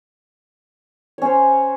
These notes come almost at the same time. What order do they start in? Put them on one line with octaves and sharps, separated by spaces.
C#5 C#4 C5